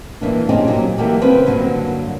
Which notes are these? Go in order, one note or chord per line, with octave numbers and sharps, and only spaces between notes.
G2 E3 A#3 D4
A#3 C4 C#4 D#4 G4 G#4
A#2 F#3 G4
E3 F#3 A#3 G4 A4 D5
C#3 C4 C#4 B4
G2 D3 F#3 A#3